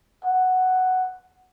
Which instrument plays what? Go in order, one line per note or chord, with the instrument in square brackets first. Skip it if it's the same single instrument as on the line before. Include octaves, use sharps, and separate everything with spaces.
[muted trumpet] F#5